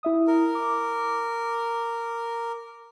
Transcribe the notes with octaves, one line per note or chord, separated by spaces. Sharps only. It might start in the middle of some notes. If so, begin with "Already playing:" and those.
E4 E5 D#6
A#4
D6